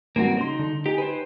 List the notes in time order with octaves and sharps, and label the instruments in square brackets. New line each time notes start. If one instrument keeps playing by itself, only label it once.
[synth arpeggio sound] G#2 E3 G3 [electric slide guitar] A#3 C4 F#4
[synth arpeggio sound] C#3 C6 [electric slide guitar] D#4
[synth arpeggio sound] D3
[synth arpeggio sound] D#4 G#5 [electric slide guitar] G4
[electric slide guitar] B4 C5